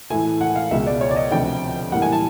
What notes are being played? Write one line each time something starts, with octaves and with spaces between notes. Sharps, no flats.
A2 E3 A3 G#5
F#5
F5
C#2 B2 G#3 E5
D5
C#5
D5
D#5
D2 C3 F3 G5
A2 E3 G3 A#3 F#5
G#5
A5